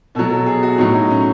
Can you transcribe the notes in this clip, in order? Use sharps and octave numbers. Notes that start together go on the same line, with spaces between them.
B2 F#3 A4
A4
G#4
F#4
A2 F#3 D#4
D#4
C#4